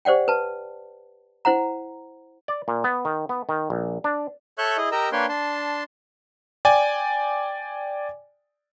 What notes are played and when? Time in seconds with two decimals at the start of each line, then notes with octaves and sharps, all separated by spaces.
0.05 G4 C5 D5 F#5 G5
0.28 B4 A5
1.45 E4 C5 F#5 A#5
2.48 D5
2.68 A#2
2.84 B3
3.05 D#3
3.29 B3
3.49 D#3
3.70 A#1
4.04 D4
4.58 A4 C#5 E5 C#6 F#6 G6
4.77 E4 G#4 D#5
4.92 G4 A#4 D#5 A#5 E6
5.12 A#3 D4 B4 C#5 G5 C6
5.29 D4 A5 C6
6.65 D5 G5 G#5